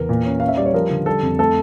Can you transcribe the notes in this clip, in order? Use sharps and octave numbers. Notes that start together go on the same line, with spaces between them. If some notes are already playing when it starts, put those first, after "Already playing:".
Already playing: E2 A#4
A#2
C#4
C#4 F5
E5
G3 D5
C#5
F3 A#4
D3
G3 A4
F2
A3 A4